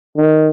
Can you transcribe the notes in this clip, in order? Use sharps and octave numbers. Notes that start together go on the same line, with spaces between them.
D#3